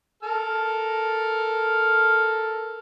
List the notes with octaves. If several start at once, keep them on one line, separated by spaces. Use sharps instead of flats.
A4 A#4 F6